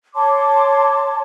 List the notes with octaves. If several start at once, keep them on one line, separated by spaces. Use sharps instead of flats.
C#5 A5 C6 D6